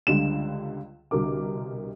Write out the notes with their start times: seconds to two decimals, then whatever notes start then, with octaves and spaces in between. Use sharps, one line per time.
0.07 C#2 D3 G3 E7
1.11 C2 B2 D3 A#4 D6